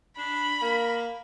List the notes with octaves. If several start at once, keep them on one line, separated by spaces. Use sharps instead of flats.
D4 B5
A#3